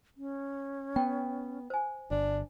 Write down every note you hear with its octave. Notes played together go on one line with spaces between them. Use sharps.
C#4
B3 G5
C5 G#5
G1 D4